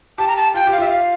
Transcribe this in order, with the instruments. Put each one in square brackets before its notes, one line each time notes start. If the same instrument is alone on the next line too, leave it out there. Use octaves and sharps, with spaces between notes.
[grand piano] G4 [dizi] A5
[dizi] A#5
A5
[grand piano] F4 [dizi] G5
[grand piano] G4
[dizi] F5
[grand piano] F4 [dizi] E5
[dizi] F5